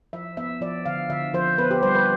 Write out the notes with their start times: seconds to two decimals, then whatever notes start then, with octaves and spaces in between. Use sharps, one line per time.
0.13 F3 E5
0.37 B3 E5
0.61 F3 D5
0.85 D3 F5
1.10 D3 E5
1.34 F3 C5
1.58 B3 B4
1.71 G4
1.82 G3 C5
1.95 B4